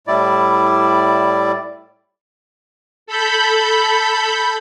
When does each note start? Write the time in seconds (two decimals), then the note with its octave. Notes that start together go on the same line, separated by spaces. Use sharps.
0.07 A2 G3 E4 D5
3.06 A4 B5 G6